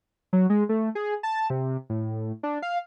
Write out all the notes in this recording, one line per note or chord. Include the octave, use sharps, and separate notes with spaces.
F#3
G#3
A3
G#4
A5
C3
A2
D4
F5